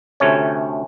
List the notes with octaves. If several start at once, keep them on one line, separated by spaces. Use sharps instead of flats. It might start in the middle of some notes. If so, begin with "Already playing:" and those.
D2 C3 A3 C#4 C#5